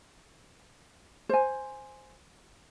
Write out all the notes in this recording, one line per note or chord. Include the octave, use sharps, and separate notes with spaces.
C5 G#5